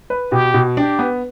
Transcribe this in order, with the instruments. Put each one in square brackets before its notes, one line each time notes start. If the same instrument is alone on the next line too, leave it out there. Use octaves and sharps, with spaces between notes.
[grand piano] B4
[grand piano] B2 [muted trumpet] G4
[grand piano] B2
[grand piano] D4 [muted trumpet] G4
[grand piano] B3